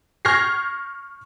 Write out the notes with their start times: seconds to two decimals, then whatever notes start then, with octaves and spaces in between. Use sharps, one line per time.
0.25 C#6 F6 G6 G#6 A#6 C7